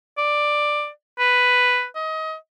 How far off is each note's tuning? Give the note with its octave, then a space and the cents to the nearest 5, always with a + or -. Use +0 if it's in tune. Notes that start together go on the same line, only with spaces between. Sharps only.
D5 +10
B4 +5
D#5 +25